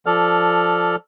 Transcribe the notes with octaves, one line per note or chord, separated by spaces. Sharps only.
F3 A4 D5 F6